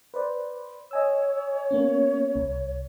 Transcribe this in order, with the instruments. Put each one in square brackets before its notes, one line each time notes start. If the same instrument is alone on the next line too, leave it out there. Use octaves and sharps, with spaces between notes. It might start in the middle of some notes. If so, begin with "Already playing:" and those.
[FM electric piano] B4 C5 D5
[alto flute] C#5 [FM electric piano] D#5 G#5 E6
[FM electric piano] A#3 B3 C#4
C2